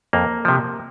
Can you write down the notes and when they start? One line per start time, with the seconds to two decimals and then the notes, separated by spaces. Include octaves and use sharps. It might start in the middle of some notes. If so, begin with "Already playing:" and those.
0.13 F2 A#3
0.45 C3 F3